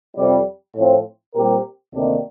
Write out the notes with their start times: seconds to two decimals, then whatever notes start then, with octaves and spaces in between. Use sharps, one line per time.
0.16 F2 C3 G3
0.76 A2 F3 C4
1.35 A#2 G3 C4 G4 A#4
1.94 D2 C3 D#3 A#3 D4